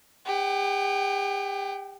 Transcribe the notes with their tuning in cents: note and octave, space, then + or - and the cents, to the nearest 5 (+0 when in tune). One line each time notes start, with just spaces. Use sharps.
G4 +40 G5 -35